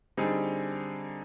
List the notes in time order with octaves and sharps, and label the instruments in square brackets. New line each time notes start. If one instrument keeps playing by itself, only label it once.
[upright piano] D3 G3 C4 D#4 G#4